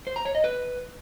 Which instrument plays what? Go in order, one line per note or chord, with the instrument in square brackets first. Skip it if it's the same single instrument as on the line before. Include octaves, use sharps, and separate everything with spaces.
[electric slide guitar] C5
A#5
C#5
D#5
B4